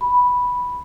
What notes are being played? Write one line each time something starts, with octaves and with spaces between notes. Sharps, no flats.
B5